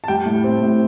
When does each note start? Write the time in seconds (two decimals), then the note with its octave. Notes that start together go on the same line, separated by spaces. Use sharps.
0.04 A5
0.08 G3 G5
0.26 A2
0.44 C4
0.62 A2